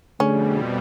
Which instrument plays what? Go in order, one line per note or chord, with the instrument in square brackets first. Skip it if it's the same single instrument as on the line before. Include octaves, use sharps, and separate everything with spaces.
[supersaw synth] F2 B2 G3 [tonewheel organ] D3 D4 G#4 [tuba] A3 [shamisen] C#4